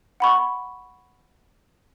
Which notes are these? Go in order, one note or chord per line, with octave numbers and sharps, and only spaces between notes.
F#5 B5 C#6